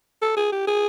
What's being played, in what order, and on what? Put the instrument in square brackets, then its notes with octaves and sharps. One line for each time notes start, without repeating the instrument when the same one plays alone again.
[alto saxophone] A4
G#4
G4
G#4